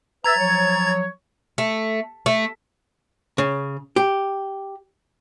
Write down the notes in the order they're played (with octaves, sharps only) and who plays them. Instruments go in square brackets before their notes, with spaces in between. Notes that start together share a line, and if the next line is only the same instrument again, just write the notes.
[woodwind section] B4 E5 [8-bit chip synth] A#5 G#6 A6
[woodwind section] F3 F#3 C#5
[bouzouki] A3
A3
[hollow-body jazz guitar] C#3
G4